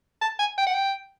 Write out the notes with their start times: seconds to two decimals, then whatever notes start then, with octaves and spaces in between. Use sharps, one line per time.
0.22 A5
0.39 G#5
0.58 G5
0.67 F#5
0.74 G5